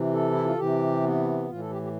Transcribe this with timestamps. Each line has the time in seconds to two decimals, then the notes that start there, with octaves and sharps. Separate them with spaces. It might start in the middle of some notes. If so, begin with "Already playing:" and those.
Already playing: C3 E3
0.13 A4
0.32 E4
0.44 F4
0.57 C3 E3 G4
1.03 B3
1.48 A2 E3 F4
1.59 A4
1.70 G4
1.82 G4